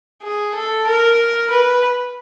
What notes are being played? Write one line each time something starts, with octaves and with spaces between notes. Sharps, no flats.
G#4
A4
A#4
B4